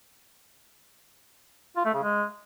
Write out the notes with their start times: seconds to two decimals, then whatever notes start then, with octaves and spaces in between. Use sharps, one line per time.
1.77 F4
1.85 A3
1.94 C#3
2.03 G#3